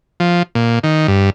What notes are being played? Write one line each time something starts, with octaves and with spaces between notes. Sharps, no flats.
F3
A#2
D#3
G2